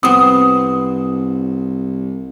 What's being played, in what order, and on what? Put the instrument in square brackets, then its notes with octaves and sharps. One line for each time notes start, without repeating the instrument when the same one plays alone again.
[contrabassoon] C2 [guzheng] B3 C4 [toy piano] D#6